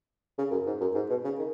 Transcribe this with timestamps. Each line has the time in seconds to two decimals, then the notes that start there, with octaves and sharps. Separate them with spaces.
0.38 C#3
0.51 F#2
0.66 G#2
0.81 F#2
0.94 G#2
1.09 B2
1.24 C#3
1.39 D#3